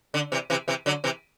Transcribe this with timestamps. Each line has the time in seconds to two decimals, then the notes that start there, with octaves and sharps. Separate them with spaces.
0.14 D3
0.32 C3 E3
0.50 C3 E3
0.68 C3 E3
0.86 D3 F#3
1.04 C3 E3